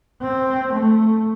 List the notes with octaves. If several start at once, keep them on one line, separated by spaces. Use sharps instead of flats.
C4
A3